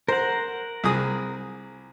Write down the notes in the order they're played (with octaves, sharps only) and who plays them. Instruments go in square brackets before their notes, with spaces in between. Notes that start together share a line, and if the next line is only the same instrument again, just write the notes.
[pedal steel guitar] A#4 F#5 [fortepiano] C5
[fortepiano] C2 G#4 D#6